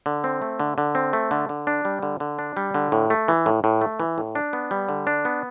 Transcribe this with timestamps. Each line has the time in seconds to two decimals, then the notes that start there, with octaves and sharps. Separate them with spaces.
0.06 D3
0.24 C4
0.42 A3
0.59 D3
0.78 D3
0.95 C4
1.13 A3
1.31 D3
1.49 D3
1.67 D4
1.85 G3
2.02 D3
2.20 D3
2.39 D4
2.57 G3
2.74 D3
2.92 A2
3.10 A3
3.28 E3
3.46 A2
3.64 A2
3.81 A3
4.00 E3
4.18 A2
4.35 D4
4.53 B3
4.71 G3
4.89 D3
5.07 D4
5.25 B3